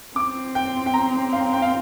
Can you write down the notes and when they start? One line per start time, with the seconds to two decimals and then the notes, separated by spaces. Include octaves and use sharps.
0.16 C4 D6
0.55 G5
0.86 G5
0.94 A#5
1.33 F5
1.53 G5
1.62 F5